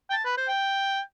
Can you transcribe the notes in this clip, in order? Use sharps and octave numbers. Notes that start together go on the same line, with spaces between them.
G5
A5
B4
C5
G5